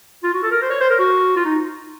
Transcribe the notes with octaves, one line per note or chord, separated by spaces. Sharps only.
F4
F#4
A4
A#4
C5
C#5
C5
A#4
F#4
F4
D#4